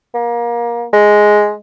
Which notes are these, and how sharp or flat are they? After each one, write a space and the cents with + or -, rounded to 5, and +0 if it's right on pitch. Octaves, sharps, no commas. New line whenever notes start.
A#3 +25
G#3 +5